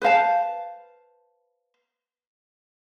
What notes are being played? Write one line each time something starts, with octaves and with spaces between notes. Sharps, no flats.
B4 C5 F5 A5